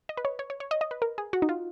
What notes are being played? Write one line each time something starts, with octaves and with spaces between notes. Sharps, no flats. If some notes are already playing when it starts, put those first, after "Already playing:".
D#5
B4
C#5
C#5
C#5
C#5
D#5
D#5
B4
A#4
G#4
F#4
D#4
F4